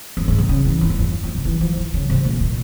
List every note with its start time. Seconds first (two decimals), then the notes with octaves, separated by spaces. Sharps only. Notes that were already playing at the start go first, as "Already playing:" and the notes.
0.17 F2
0.28 G#2
0.38 C3
0.49 C#3
0.65 E3
0.81 F2
0.90 E2
0.99 F2
1.24 F2
1.34 C#3
1.45 E3
1.61 F3
1.77 E3
1.94 C#3
2.10 C3
2.25 A#2
2.40 A#2